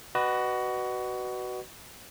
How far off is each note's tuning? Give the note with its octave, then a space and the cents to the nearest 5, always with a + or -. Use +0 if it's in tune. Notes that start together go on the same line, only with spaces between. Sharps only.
F#4 +20 B4 +0 D#5 -35